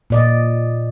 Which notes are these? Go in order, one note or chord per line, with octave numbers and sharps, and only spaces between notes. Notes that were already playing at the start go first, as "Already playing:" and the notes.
A#2 D5 D#5